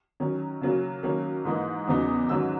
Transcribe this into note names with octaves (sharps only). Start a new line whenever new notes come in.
D#3 F#3 C#4
C#3 F#3 A#3 C#4
D#3 F#3 A#3 C#4
G#2 E3 A#3 D#4
E2 C#3 F#3 B3 D#4
G#2 D#3 F#3 C#4 E6